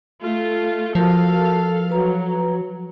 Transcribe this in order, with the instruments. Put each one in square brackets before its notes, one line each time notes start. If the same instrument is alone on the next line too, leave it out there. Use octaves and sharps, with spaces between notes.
[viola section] A3 F4
[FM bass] F3 [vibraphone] F#4 A#4 A5 [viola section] A4 F5
[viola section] F#3 [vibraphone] B4 A#5